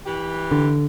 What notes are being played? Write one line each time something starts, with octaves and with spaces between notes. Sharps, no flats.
E3 G4
D3